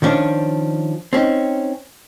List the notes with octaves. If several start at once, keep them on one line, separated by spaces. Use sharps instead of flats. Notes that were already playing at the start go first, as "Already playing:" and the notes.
D#3 F3 C#4 D4
C4 C#4 D#4